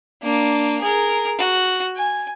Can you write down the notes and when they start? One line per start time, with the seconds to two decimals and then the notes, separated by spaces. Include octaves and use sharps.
0.22 A#3 D4
0.81 G#4 A#4
1.38 F#4
1.97 G#5